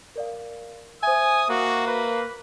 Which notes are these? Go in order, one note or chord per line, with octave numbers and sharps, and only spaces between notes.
A#4 D5 F5
C5 E5 G#5 D#6
A#3 F#4
B4